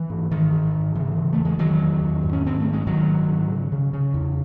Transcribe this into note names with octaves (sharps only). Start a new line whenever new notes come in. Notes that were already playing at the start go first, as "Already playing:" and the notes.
Already playing: E3
G#2
G#2 D#3
G#2
G#2
C#3 E3
C#3
A3
E2
G#3
E2 D#3 F#3
E2
E2
G#2
C#4
G#2 C4
A3
G#2
G#3
G#2 D#3 F#3
G#2
G#2
C#3
C#3
C#3
E2